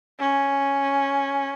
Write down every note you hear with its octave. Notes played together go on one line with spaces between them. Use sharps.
C#4